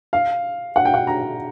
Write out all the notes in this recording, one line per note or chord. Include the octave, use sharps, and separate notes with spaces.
F5
F#5
G5
F#5
A#5